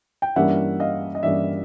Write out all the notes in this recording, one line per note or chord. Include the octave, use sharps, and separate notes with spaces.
G5
G2 E3 G3 A#3 C#4 E5 F#5
D#5 F5
D#5
G2 E3 G3 A#3 C#4 D5 E5